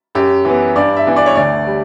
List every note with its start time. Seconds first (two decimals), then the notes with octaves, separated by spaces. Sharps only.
0.15 F#2 G4
0.45 E3 B3
0.76 G2 D5
0.96 E5
1.06 E3 B3
1.16 D5
1.26 C#5
1.36 D2 D5
1.67 G3